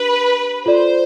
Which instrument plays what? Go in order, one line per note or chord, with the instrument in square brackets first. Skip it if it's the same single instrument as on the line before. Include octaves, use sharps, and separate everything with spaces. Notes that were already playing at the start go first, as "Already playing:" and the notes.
Already playing: [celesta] D4 G4 A#4 [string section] B4
[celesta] F4 A4 D5 [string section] C5